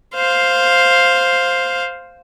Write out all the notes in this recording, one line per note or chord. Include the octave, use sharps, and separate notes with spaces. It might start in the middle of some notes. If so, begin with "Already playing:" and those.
C5 F5